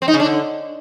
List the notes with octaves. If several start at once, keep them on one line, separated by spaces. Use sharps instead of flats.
C4
D#4
C#3
D4
D3